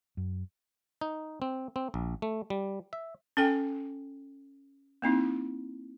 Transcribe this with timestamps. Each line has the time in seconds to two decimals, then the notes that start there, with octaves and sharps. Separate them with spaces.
0.17 F#2
1.01 D#4
1.42 C4
1.76 C4
1.94 A#1
2.22 A3
2.50 G3
2.93 E5
3.37 C#4 A4 G5 G#5
5.02 A#3 C4 D#4 E4